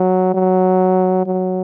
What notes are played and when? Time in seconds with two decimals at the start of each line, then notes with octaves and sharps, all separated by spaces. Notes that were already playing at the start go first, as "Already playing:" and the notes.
Already playing: F#3
0.34 F#3
1.26 F#3